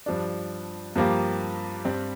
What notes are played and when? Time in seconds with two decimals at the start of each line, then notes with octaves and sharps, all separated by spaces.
0.06 G2 F3 D4
0.96 G2 F3 A#3 G4
1.85 G2 G3 C4